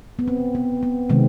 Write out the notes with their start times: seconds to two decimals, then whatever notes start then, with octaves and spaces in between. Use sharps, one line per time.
0.19 B3
0.28 C4
0.55 B3
0.83 B3
1.09 C3 D#3 G#3 C4